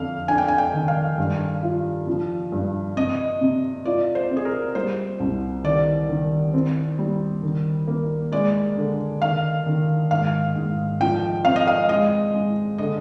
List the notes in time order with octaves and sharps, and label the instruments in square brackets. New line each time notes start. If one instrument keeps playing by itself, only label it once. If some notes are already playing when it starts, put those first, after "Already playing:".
Already playing: [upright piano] F2 D3 [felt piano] F5
[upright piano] D4 [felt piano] G#5
[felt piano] G5
G#5
G5
[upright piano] D#3
[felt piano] F5
[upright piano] G2
F4
F3
G2
[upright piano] C3 [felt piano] D#5
[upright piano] C3
[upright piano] F4 [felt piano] D5
[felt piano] C5
[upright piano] C4
[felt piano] G#4
A#4
[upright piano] G3 [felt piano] C5
[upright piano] C2
[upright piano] D#3 [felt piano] D5
[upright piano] D#3
C4
G3
D#3
A#3
[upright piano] G#3 [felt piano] D5
[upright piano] D3
[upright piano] D#3 [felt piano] F5
[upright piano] D#3
[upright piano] G#2 [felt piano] F5
[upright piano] G#2
[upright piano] F3 [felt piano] G5
[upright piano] C4 [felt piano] F5
[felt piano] D#5
F5
[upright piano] G#3 [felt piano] D#5
[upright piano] G#3
[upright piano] D3 [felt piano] D#5